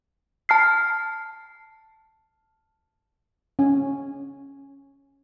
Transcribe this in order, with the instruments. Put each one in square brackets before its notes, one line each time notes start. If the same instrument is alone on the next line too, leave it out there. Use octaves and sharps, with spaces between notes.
[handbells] A5 F6 C7
[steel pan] C#4 G#5